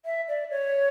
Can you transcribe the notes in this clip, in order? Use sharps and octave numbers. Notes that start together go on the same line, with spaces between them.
E5
D5
C#5